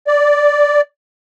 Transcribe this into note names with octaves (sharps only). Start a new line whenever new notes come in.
D5